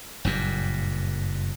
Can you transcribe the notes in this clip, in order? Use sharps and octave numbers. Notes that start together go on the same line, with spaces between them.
F#1 G2 A#2